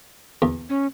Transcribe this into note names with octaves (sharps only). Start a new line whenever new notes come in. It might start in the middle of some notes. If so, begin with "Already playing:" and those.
E2
C#4